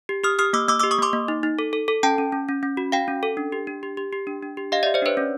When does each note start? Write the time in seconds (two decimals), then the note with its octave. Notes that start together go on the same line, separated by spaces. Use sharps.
0.09 G4
0.24 G4 D#6 F6
0.39 G4 D#6 F6
0.53 A#3 D6 E6
0.68 A#3 D6 E6
0.79 D6 E6
0.83 G4
0.91 C#6 D#6
0.99 A#3 C6 D6
1.13 A#3
1.28 D#4
1.43 D#4
1.59 A4
1.73 A4
1.88 A4
2.03 C#4 G5 A5
2.18 C#4
2.32 C#4
2.49 C#4
2.63 C#4
2.77 F#4
2.92 F#4 F5 G5
3.08 C#4
3.23 A4
3.37 D4
3.52 G4
3.67 D4
3.83 G4
3.97 G4
4.13 G4
4.27 D4
4.43 D4
4.57 G4
4.72 G4 D#5 F5
4.83 D5 E5
4.86 G4
4.94 C5 D5
5.02 D4 B4 C#5
5.17 C#4